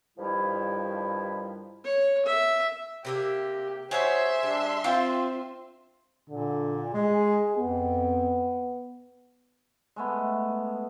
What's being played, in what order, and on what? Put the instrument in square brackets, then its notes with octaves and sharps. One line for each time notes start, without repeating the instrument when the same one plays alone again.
[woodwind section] G2 D#3 F3 G3 E4
[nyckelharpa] C#5
E5
[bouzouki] C3 A#3 E5 [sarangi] G4
[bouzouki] E4 F#4 C#5 [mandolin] G#4 [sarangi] C5 [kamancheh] E5 C6
[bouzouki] G3 [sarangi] D4
[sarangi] C4 [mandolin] F4 [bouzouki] F5 G5
[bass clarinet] A#2 [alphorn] D3
[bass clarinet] G#3 [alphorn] G#4
[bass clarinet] F2 [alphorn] B3
[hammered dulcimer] G#3 A3 B3